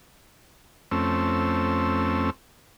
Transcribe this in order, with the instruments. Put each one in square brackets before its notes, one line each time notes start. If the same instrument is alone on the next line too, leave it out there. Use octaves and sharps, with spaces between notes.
[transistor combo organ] F2 A3 C4 C#4 E6